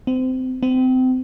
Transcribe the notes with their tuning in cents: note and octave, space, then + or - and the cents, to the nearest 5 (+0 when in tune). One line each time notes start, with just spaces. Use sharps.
C4 -25
C4 -30